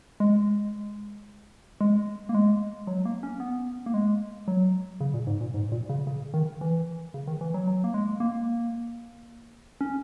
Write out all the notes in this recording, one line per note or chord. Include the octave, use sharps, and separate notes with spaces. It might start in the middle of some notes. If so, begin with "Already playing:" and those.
G#3
G#3
A#3
G#3
F#3
A#3
C#4
B3
A#3
G#3
F#3
C#3
A#2
G#2
A#2
G#2
A#2
C#3
C#3
D#3
E3
C#3
D#3
E3
F#3
F#3
A#3
G#3
A#3
C#4